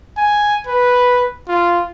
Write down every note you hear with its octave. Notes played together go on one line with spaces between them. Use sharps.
G#5
B4
F4